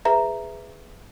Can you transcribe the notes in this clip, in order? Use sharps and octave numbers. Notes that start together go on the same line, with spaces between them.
G#4 B4 E5 A#5